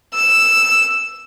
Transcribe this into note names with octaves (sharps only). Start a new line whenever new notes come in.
E6